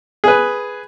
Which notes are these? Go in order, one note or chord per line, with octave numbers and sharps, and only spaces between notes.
G#4 B4